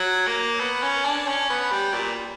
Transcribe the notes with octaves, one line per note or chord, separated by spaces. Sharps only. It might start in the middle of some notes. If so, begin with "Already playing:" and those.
Already playing: F#3
A#3
B3
C#4
D4
C#4
B3
G3
A#2